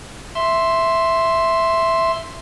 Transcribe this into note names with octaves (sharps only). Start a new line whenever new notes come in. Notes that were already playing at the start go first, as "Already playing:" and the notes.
E5 C6